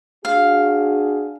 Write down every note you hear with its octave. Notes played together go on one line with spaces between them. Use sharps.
D4 F#4 G#4 F5